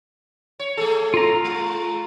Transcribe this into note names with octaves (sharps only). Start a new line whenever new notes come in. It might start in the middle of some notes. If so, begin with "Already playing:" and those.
C#5
A3 G#4 A4
F4 A#5
G#3